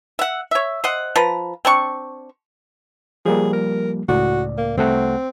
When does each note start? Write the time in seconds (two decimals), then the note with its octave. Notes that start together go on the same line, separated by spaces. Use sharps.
0.19 E5 F#5
0.51 C#5 E5
0.84 C5 D#5 F#5
1.16 F3 B4 A#5
1.65 C4 D4 C#6
3.25 F3 G3 A#3 G#4
3.53 A#4
4.08 C#2 A2 F#4 D5
4.58 A#3
4.77 C2 A3 C4 F#5